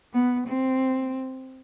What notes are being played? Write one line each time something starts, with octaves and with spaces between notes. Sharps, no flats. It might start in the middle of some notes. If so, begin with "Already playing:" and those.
B3
C4